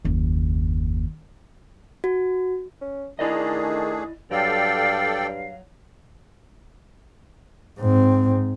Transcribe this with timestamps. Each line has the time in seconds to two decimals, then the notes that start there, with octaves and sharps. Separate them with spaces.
0.05 F#1 D#2
2.04 F#4
2.81 C#4
3.19 D#3 A3 D4 E4 G#4 D5 D#5
4.31 G2 F#3 A4 D5 F5 G5
7.79 G#2 C4